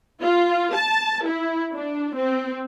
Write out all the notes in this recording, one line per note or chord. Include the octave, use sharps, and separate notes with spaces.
F4
A5
E4
D4
C4